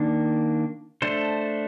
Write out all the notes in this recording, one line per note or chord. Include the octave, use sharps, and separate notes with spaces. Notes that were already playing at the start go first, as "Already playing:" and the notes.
Already playing: D#3 A#3 D4
A3 D4 A4 C5